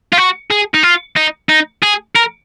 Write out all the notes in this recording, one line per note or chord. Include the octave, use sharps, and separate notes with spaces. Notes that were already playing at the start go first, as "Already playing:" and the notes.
F4
F#4
G#4
D#4
F4
D#4
D#4
G#4
A#4